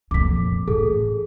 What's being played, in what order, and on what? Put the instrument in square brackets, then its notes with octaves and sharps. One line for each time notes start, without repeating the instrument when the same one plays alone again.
[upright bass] F2 A#2 [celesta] D6 B6
[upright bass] A1 [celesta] G#4 A4